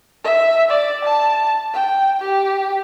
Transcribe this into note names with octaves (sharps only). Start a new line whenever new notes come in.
E5
D5
A5
G5
G4